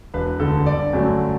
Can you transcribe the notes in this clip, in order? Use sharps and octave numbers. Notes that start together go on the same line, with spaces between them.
E1 B4
D2 D3 A4
G1 D5
F#2 D3 F#3 A3